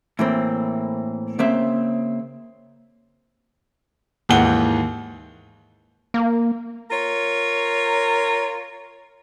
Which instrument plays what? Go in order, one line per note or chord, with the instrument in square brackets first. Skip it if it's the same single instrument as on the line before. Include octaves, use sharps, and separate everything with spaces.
[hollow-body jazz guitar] A2 E3 A#3 C4
C#3 A#3 C4 E5
[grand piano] D#2 G#2 E3 F#5 G7
[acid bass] A#3
[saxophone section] F4 A#4 C#5